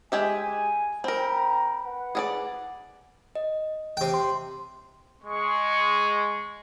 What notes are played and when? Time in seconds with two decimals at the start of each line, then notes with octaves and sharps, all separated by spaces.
0.12 G#3 G4 E5 G#5
1.04 C4 A#4 G5 A#5 B5
1.84 B4 F#5
2.15 G#4 A4 D5
3.35 D#5
3.97 C3 G5
4.14 C6
5.23 G#3 C#6